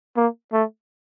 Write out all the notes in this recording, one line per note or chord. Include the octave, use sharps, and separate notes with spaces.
A#3
A3